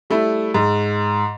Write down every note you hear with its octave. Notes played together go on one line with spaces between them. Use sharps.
G3 A3 E4 E5
G#2